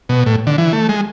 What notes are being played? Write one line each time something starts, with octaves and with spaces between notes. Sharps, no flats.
B2
A2
D3
E3
A3
G#3